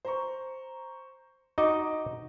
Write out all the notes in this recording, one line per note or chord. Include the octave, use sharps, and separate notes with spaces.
C5 A#5 C#6
D#4 F#4 D#5 D6